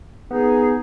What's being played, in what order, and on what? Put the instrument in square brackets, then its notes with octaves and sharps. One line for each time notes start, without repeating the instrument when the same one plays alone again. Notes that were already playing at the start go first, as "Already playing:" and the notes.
[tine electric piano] B3 [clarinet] D#4 [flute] G#4